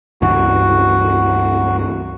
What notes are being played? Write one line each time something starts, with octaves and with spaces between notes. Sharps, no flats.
C#2 G2 E3 F#4